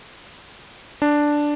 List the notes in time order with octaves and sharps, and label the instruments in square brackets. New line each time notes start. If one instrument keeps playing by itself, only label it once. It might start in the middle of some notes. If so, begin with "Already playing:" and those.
[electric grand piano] D4